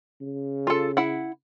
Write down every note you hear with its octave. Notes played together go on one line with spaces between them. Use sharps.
C#3
F4 A4
E4 F#5